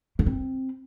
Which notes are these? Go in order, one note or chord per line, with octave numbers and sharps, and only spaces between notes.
A#3
C4